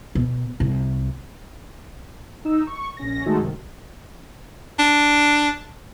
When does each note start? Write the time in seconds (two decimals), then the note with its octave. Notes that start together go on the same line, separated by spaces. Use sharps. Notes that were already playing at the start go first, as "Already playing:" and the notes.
0.15 B2
0.60 C2
2.45 D#4 E6
2.67 C#6
2.97 A#1 C#4 A#6
3.26 D#3 G#3 A3 D#4 F#4 A4
3.38 F#2 C3 D#3
4.79 D4